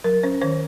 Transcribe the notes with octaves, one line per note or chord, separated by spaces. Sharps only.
F#3 A#4
C#4 C5
D#3 C5